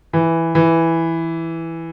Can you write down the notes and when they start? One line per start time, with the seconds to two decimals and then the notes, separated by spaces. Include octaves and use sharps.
0.13 E3
0.55 E3